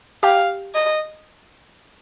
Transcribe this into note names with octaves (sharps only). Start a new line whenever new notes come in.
G4 F5 G5
D#5